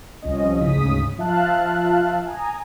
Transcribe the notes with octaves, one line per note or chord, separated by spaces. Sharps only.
C2 F3 C#4 D#5
D2 G#2 C#3 D#6 B6
F3 F4 E5 F5 A5 F#6
G#5 A#5 D#6